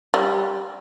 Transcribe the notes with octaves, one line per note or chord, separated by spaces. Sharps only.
G3